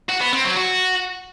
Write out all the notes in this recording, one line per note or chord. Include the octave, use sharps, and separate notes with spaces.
F#4
B3
C4
F#3
F#4